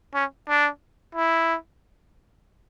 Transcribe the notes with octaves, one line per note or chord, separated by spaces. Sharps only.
C#4
D4
E4